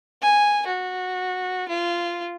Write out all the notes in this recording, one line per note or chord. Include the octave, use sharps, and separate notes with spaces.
G#5
F#4
F4